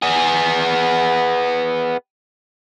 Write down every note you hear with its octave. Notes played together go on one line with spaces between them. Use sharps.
B3 G#4